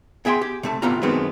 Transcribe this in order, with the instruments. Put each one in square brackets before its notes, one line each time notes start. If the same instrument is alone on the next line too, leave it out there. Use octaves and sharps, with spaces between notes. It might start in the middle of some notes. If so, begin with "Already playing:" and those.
[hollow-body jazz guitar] B3 G#4 E5 G5 C6
G4
C3 A3 A5
D2 A2 C3 B3 F4 A#5
F#2 D#3 F#3 G#3 B3 C4